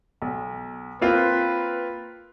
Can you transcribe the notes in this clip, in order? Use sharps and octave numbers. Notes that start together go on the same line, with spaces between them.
B1
A#3 C4 F4 B4